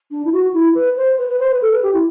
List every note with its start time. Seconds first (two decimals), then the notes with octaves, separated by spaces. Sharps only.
0.11 D4
0.24 E4
0.32 F#4
0.53 E4
0.74 B4
0.96 C5
1.18 B4
1.29 B4
1.39 C5
1.50 B4
1.61 A4
1.72 B4
1.82 G4
1.93 E4